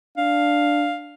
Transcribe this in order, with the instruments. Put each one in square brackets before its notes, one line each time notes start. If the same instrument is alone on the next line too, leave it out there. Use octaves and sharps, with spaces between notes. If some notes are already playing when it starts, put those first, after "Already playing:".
[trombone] D4 [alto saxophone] F5